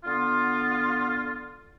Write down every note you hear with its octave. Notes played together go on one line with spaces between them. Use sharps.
D3 B3 F4